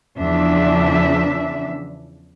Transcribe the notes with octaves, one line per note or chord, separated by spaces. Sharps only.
E2 C#3 F3 D4 E5